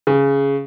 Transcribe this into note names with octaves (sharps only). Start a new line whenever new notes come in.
C#3